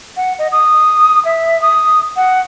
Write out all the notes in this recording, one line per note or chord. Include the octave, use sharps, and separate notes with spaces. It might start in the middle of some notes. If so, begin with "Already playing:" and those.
F#5
D#5
D#6
E5
D#6
F#5